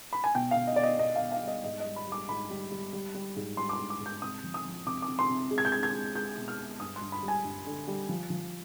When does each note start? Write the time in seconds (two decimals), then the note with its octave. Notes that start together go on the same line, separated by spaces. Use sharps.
0.13 B5
0.24 G#5
0.35 B2 G5
0.51 B2 F5
0.67 D#5
0.76 B2 D5
0.83 D#5
0.99 B2 D#5
1.16 F5
1.21 B2
1.32 F5
1.43 G3 D#5
1.64 G#2 D#5
1.80 D#5
1.86 G3
1.96 B5
2.07 G3 D6
2.29 G#2 B5
2.50 G3
2.71 G3
2.93 G3
3.14 G3
3.36 G#2
3.57 G3 C6
3.69 D6
3.73 C6
3.79 G#2
3.90 D6
4.00 G#2
4.06 G6
4.22 C3 D#6
4.44 F3
4.54 D#6
4.64 F3
4.86 C3 D6
5.02 D6
5.08 C3
5.19 C6
5.29 C3
5.51 G#3
5.58 G#6
5.65 G6
5.72 G#3 G#6
5.83 G#6
5.94 G#3
6.15 G#3 G6
6.37 B2
6.48 F6
6.59 G#3
6.80 G2 D#6
6.96 C6
7.01 G2
7.12 B5
7.23 G3
7.28 G#5
7.44 G2
7.66 D3
7.88 G3
8.09 F3
8.30 F3